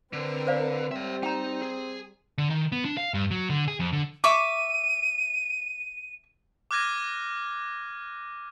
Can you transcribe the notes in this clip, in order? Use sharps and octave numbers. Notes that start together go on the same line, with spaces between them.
D3 C4 A#4 B4
C5 D5 F5
G3 C4 C#5 E5
D#4 G5 A#5
G#4
D3
D#3
B3
D4
F5
G2
F#3
D3
G#4
F2
D3
E5 C#6 D6 D#7
D6 F6 F#6 G#6 A#6 D#7